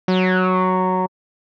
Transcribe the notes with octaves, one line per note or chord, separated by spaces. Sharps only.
F#3